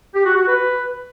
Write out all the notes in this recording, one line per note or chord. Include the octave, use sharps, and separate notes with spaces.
G4
F#4
F#4
B4